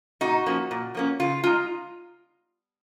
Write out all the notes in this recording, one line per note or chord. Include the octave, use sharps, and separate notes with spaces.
A#2 D#4 F#4
F3 A#3 C#4
A#2
F3 A#3 C#4
C#3 F4
G#3 D#4 F4